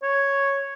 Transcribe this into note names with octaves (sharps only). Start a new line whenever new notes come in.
C#5